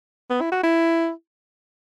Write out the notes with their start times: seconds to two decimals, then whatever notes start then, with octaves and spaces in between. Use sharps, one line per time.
0.30 B3
0.41 E4
0.52 F#4
0.63 E4